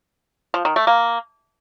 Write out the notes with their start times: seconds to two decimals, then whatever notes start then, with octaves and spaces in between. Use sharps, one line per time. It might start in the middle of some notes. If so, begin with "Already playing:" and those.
0.54 F3
0.65 D#3
0.76 A3
0.87 A#3